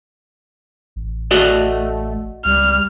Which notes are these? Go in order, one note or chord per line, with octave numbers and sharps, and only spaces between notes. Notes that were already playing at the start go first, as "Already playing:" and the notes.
A1
A3 F#4 D5 D#5
C#2 G3 F6